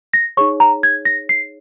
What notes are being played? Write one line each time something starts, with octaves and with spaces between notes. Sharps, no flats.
A#6
D#4 G#4 C#5 C#6
A#5
G#6
A#6
C7